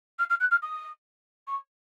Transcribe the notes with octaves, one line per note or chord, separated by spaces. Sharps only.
F6
F6
F#6
F6
D#6
C#6